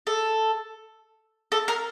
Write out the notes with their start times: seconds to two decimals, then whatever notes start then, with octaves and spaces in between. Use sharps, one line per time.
0.07 A4
1.52 A4
1.68 A#4